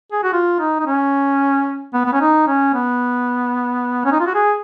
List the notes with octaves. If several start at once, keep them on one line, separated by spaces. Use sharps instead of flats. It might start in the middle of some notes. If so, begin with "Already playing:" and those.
G#4
F#4
F4
D#4
D#4
C#4
B3
B3
C#4
D#4
C#4
B3
C#4
D#4
F4
F#4
G#4